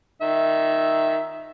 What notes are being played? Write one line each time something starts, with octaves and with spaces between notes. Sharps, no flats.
D#3 E5